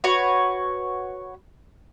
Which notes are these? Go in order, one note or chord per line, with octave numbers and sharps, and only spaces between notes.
F#4 B4 C#5